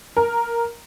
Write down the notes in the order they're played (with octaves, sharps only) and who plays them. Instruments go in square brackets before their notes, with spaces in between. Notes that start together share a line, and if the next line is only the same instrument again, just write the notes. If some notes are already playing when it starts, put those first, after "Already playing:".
[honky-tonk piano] A#4